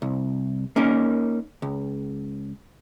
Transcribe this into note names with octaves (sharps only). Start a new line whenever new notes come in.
C2
A#3 C#4 D#4 A#4
C#2